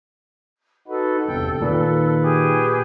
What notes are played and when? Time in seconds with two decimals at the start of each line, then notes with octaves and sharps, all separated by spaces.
0.88 D#4 F#4 A4 B4
1.28 G1 E2 C3 G5
1.62 A#2 D#3 B4
2.20 G4 G#4